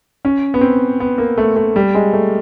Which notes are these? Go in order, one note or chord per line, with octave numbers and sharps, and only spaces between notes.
C#4
B3
C4
B3
A#3
A3
A3
G3
G#3
A3